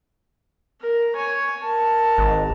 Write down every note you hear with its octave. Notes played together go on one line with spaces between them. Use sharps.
A#4
C#5 G#5
A#4 A5
G#1